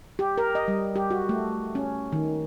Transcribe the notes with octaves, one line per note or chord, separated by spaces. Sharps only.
G4
A#4
D#5
G3
G4
F#4
A3
C#4
D#3